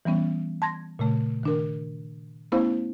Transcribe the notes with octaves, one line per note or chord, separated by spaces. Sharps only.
E3 G3 B3 C#4
A5 C6 G#6 A#6
A#2 C#3 A3
D#3 D4 A#4
A3 B3 C#4 E4 C5 F5